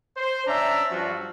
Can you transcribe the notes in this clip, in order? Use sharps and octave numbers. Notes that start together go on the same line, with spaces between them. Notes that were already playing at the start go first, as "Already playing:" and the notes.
C5
C#4 D4 D5 E5 A#5
G2 F3 F#3 F4 F#4